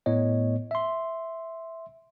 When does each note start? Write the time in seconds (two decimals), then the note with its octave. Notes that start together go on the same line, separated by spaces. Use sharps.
0.06 A2 A3 B3 C#5 D#5
0.71 E5 C6